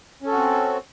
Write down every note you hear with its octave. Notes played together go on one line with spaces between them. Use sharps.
C4 C#4 F#4 A4